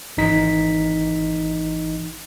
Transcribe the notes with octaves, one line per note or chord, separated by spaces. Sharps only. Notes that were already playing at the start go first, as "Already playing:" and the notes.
G#1 E3 D#4 B6